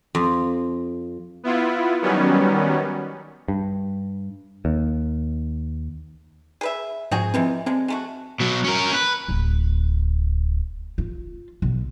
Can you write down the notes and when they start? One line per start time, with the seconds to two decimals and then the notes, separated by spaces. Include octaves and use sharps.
0.15 F2
1.43 B3 E4 F4
2.02 D#3 F#3 G3 B3 C#4
3.48 G2
4.65 D#2
6.61 G#4 B4 E5
7.11 G#2 F3 C4 F#4 G#4
7.34 C3 E3 F3 G#3 C4
7.66 D3 G#3 C4
7.88 G#3 A3 F#4
8.40 B2 F#3
8.64 C#4 A#4
8.94 B4
9.28 D1
10.98 F4
11.62 B1